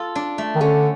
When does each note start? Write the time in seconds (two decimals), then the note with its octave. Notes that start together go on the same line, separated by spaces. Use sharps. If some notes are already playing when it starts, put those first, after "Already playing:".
Already playing: F4 A4
0.15 D4
0.38 A3
0.55 D#3
0.61 D3 C#4